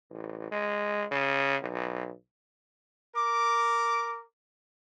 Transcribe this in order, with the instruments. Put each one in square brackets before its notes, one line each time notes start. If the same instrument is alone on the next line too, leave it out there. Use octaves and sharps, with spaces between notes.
[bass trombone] A1
G#3
C#3
B1
[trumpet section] A#4 D6